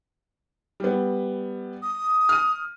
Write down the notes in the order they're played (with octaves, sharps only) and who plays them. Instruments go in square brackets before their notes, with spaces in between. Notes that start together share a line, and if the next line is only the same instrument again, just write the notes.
[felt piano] G3 B3
[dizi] D#6
[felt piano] F6 D#7